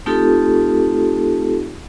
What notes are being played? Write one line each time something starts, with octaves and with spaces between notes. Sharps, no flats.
A3 C4 D#4 F4 G4 A4